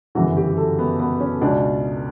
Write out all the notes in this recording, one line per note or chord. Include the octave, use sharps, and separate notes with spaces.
G1 F#2 C#3 E3 F#4
G4
A4
B3
B3
C#4
C#2 B2 D4